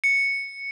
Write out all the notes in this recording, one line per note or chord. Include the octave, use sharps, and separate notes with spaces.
C#7